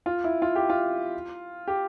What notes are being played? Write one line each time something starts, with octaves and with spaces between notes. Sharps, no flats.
F4
E4
F4
G4
F4
G4